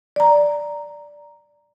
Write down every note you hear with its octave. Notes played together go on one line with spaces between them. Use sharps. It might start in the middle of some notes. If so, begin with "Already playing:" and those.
D5 A#5